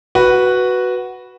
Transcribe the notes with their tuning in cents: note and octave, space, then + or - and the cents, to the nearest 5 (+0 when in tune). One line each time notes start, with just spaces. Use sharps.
F#4 +0 B4 -5